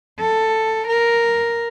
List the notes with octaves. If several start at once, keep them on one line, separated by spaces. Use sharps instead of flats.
A4
A#4